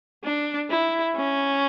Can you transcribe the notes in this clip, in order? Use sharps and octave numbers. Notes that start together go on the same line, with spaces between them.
D4
E4
C#4